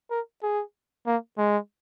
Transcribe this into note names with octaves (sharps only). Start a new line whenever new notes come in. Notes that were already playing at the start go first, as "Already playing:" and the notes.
A#4
G#4
A#3
G#3